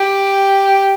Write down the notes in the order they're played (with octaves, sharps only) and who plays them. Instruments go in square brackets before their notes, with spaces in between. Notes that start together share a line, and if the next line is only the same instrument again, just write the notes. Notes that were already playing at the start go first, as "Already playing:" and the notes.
Already playing: [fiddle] G4